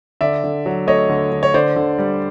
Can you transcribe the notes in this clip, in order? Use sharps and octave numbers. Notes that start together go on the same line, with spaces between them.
D3 D5 E5
D3
F#3
A3 C#5 D#5
D3
D3
C#5
D3 C5 D5
D3
G3